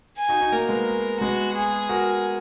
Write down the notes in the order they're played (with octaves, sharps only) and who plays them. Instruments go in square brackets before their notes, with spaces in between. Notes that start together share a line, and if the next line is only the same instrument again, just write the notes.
[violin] G#5
[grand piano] D#4 F#4
D#4 F#4
[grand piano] A#3 [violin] A#4
[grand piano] G#3 B3
[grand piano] G#3 B3 [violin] F#4
[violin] G#4
[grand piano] F#4 A#4